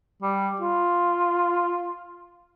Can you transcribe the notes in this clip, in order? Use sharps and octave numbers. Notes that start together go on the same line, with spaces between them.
G3
F4